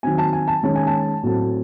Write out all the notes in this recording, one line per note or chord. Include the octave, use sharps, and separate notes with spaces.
D#3 F#3 C4 G#5
A5
G#5
A5
D#3 G#3 C#4 A5
G#5
A5
A2 F#3 A3 C4